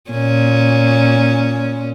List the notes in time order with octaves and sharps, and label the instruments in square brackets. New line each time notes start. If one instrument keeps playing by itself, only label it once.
[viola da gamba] A#2 C#4